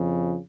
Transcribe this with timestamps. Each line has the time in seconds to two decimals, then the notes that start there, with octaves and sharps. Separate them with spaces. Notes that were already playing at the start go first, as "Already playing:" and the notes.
Already playing: F2 C#3 F3